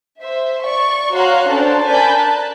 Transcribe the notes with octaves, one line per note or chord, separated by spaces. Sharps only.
C5 E5
D5 C#6
F#4 C#5 F5 A#5 C6 F#6
C#4 D4 A4 C5 A5
A#4 D5 G#5 A5 B5 G6
A5 F#6